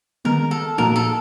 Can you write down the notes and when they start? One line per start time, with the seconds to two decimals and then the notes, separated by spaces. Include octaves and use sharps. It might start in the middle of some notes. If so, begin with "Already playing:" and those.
0.25 D#3 G#3 B3 A#4
0.51 A4
0.78 A#2 F3 A#3 D#4 F#4 A#4
0.96 A4